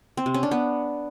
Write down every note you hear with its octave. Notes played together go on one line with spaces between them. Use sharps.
C4
C3
C#4
D4
B3